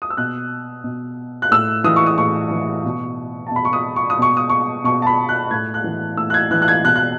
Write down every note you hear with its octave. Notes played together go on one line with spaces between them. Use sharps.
D#6
E6
B2 F#6
B2
F#6
A2 E6
E3 D#6
C#6
D#6
A2 C#6
E3
B2
A5
B2 B5
C#6
D#6
C#6
D#6
B2 C#6
D#6
C#6
B2 C#6
A5
B5
F#6
A2 G#6
F#6
E3
A2 E6
F#6
G#6
E3 F#6
F#6
G#6
B2 F#6
F#6